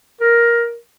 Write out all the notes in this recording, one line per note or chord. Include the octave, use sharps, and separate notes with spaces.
A#4